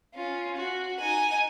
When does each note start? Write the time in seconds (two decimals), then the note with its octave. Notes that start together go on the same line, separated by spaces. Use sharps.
0.15 C#4 F4
0.57 F#4
1.01 D#4 G#5